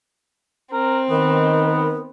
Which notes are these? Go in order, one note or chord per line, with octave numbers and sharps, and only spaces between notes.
C4 A#4
D#3 B3 A#4